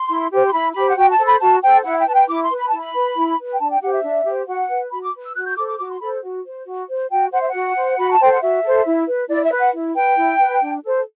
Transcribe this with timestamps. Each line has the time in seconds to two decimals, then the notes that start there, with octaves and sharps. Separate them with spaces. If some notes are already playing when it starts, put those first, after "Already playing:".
Already playing: C6
0.09 E4
0.32 G4 C5
0.46 C6
0.53 E4 B5
0.75 G4 C5 B5
0.90 F#5
0.96 F#4 G5
1.11 A5
1.19 A4 C5
1.27 B5
1.41 F#4 A5
1.62 A4 C5 G5
1.84 E4 F#5
1.99 G5
2.07 B4 A5
2.14 G5
2.29 E4 D6
2.43 C6
2.50 B4
2.58 B5
2.68 E4 A5
2.80 B5
2.95 B4
3.16 E4
3.38 B4
3.52 G5
3.59 D4 A5
3.71 G5
3.81 G4 C5 F#5
3.93 E5
4.03 D4
4.25 G4 C5
4.47 F#4 F#5
4.69 B4
4.91 F#4 B5
5.02 D6
5.13 B4
5.24 E6
5.35 F#4 F#6
5.46 G6
5.57 A4 C5 D6
5.68 D6
5.79 F#4 D6
5.90 C6
6.01 A4 C5 B5
6.23 F#4
6.45 C5
6.66 F#4
6.89 C5
7.10 F#4 G5
7.32 C5 F#5
7.40 E5
7.49 F#4 F#5
7.76 C5
7.97 F#4 B5
8.11 A5
8.20 A4 C5 G5
8.32 F#5
8.41 F#4 E5
8.64 A4 C5
8.86 E4
9.07 B4
9.29 E4 D5
9.44 E5
9.52 B4
9.59 F#5
9.73 E4
9.95 B4 G5
10.17 E4
10.39 B4
10.61 D4
10.83 A4 C5